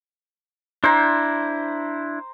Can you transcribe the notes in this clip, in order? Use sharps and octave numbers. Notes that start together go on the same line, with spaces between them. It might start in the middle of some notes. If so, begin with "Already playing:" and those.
D4 E4 C5 A#5